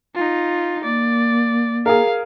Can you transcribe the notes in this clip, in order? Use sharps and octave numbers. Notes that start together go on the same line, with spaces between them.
D#4 F4
A#3 D5
G#4 A#4 F5